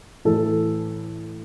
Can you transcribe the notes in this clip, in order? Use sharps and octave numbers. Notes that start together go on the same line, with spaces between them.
A2 E3 A4